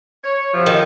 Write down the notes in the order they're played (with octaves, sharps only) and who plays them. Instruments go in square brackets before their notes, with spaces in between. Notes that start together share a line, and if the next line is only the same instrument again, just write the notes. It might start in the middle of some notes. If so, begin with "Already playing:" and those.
[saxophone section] C#5
F#2 C3 F3
[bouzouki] D#3